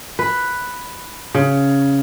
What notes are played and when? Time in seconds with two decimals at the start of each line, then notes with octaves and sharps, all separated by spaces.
0.19 B4
1.35 C#3